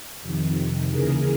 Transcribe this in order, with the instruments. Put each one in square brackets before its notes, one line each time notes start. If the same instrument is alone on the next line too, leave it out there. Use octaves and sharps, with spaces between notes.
[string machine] F2 C3 D#3
D#2 C#3 E3 G#4 A#4